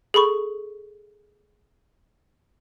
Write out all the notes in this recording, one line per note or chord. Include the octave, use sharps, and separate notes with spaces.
G#4 A4 B5 C#6